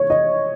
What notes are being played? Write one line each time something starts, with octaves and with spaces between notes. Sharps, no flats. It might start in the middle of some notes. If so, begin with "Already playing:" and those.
Already playing: C#5
D#5